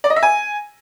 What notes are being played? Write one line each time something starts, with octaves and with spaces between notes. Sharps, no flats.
D5
D#5
E5
G#5